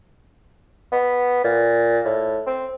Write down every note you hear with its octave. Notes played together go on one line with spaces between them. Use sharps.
B3
A#2
A2
C4